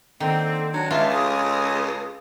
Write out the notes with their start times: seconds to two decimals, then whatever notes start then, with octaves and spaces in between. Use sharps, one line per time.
0.20 D3 D#3 A#3 C4 A4
0.73 F#3 D4
0.91 C#2 G#3 F4 E5 A5
1.11 G#4 A4 G#5 D#6